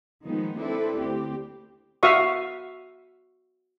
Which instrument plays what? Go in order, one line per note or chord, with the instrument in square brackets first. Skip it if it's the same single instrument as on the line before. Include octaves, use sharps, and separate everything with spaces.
[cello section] D#3 F3 G#3 B3 D#4
C4 D4 E4 A4 B4
D2 C4 G4
[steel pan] F#4 E5 F5 C#6 D#6